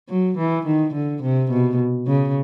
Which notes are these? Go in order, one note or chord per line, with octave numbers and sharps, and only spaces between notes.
F#3
E3
D#3
D3
C3
B2
C#3